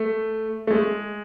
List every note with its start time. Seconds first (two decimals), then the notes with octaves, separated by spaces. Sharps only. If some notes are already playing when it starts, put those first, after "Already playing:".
Already playing: A3
0.67 A3
0.71 G#3